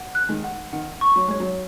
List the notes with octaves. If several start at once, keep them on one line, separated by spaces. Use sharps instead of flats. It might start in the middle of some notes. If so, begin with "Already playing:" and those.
Already playing: F#5
F#6
D#3 G#3
F#5
D#3 F#5
C#6
F#3
G#3 C#5
F#3